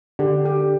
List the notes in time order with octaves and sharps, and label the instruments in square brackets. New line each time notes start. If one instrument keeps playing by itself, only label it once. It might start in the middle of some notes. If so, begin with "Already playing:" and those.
[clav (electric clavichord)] D3 [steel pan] G4
[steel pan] G4